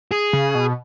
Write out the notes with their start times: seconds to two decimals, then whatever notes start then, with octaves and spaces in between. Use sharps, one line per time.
0.11 G#4
0.33 C#3
0.55 B2